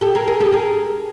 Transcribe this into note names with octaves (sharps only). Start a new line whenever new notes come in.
G4 A4
G#4 A#4
G#4 A#4
G4 A4
G#4 A#4